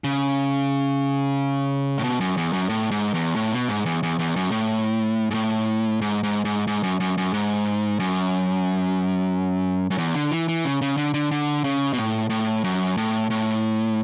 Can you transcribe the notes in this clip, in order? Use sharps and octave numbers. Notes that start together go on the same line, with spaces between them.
C#3
A2
B2
F#2
E2
F#2
A2
G#2
E2
A2
B2
G#2
E2
E2
E2
F#2
A2
G#2
A2
G#2
G#2
G#2
G#2
F#2
F#2
F#2
G#2
F#2
F#2
E2
D3
E3
E3
C#3
C#3
D3
D3
D3
C#3
B2
A2
A2
F#2
A2
A2